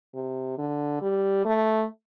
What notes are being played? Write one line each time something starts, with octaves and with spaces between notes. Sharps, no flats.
C3
D3
G3
A3